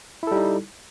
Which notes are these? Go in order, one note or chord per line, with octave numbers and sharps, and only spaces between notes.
G3 D#4 E4 A4